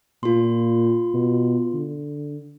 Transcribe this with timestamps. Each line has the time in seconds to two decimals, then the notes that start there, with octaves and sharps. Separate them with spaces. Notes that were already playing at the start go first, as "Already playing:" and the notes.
0.23 A#2 F4 C6
1.14 B2
1.73 D3